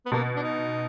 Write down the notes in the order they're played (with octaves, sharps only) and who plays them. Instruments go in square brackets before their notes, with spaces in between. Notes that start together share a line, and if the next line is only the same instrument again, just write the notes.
[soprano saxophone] B3
[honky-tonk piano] B2 [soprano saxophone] A#3
[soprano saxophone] D4
D#4